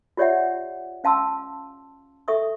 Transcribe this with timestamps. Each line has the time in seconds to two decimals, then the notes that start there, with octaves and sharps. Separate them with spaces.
0.17 F4 G4 C#5 D5 E5 F#5
1.04 C#4 F5 A5 C6 E6
2.28 A4 E5 C#6 D#6